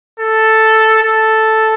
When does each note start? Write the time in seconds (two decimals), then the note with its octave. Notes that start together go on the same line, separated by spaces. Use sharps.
0.20 A4
1.03 A4